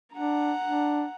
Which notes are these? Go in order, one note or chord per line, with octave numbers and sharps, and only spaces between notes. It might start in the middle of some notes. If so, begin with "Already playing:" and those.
D4 F#5 A#5
D4